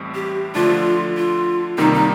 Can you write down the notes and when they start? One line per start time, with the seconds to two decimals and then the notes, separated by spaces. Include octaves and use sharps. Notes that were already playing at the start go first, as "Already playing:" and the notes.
Already playing: A1 A2 G3 C4
0.14 G4
0.55 D3 F3 A3 D4 F4
1.17 F4
1.78 C2 C3 D#3 G3 A#3 D#4
1.94 D#4